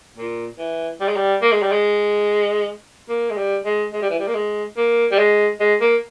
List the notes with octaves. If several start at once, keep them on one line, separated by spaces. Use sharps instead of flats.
A#2
E3
G3
G#3
G3
A#3
G#3
G3
G#3
A#3
G#3
G3
G#3
G#3
G3
E3
G3
A#3
G#3
A#3
G3
G#3
G#3
A#3